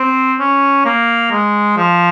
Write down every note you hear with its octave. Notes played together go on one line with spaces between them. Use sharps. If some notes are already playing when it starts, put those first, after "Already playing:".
Already playing: C4
C#4
A#3
G#3
F3